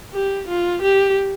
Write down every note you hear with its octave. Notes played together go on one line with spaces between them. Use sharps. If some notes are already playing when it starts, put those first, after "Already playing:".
G4
F4
G4